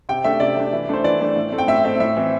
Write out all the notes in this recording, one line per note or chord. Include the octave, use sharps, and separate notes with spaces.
C3 G5
A3 D4 E5
C3 D5
A3 D4
E3
A3 D4 C5
E3 D5
A3 D4
A2
A3 C4
G5
A2 E5
A3 C4 E5
A2 E5
E3 C4